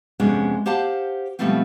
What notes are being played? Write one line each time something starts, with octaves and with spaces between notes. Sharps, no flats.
F2 C3 G#3 B3 C#4 D4
G4 C5 F5 F#5 A5
B2 F3 G3 A3 B3 C4